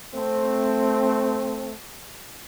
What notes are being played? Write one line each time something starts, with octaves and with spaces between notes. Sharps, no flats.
A3 C4